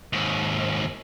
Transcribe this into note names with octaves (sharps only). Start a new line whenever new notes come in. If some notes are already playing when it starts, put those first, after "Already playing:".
D#2 G#2